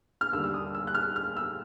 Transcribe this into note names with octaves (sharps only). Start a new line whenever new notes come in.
F6
D#2 D3 G3 E6
E6
D#6
E6
F#6
F6
F6
E6